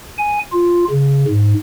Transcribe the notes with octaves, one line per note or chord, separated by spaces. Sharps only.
G#5
F4
C#3
G#2